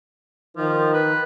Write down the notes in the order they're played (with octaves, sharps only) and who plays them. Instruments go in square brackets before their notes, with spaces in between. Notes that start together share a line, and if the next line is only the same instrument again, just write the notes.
[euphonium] D#3 [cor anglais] F3
[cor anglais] B4